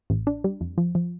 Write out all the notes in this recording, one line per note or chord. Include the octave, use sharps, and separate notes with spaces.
A1
D4
G3
F2
F3
F3